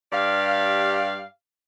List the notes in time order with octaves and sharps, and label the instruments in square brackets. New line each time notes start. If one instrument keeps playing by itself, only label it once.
[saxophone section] G2 G4 D5 F5